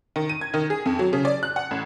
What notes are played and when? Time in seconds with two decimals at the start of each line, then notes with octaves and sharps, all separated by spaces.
0.16 D#3
0.29 D#7
0.41 G#6
0.54 D#3
0.70 G#4
0.86 F2
0.99 F#3
1.13 C#3
1.25 D5
1.43 F#6
1.56 F#5
1.71 A1